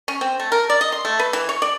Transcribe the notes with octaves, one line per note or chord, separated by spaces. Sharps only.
C#4
C4
A3
A#4
D5
D#5
C6
A3
B4
E3
C#5
D5